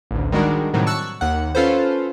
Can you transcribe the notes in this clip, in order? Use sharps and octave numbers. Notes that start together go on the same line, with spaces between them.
A1 D2
D#3 G3 G#3 D4 F#4 A#4
A2 C3 D#3 F#3 G3
A5 C#6 E6 F#6
D#2 F#5
C#4 F4 A4 B4 C5